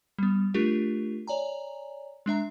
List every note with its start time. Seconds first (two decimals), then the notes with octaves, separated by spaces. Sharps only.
0.18 G3 B3
0.54 A3 D4 F4 G4 A#4
1.27 C#5 D5 G#5 A#5
2.26 G#3 D4 E5 A#5